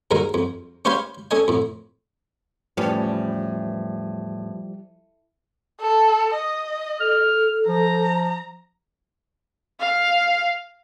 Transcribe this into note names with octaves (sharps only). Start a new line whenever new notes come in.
D#2 G#2 F#3 D#4 A#4
F2
C#4 G4 C5 C#5 F5 B5
C#4 A4 D#5 G#5
F2 A2
E2 A2 F3 G3 B3 C#4 G4
A4
D#5
A4 F6
F3 A#5
F5